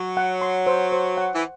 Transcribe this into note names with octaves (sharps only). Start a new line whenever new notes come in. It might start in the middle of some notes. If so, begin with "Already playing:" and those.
Already playing: F#3
F#5
C6
C5
C5
F#5
E3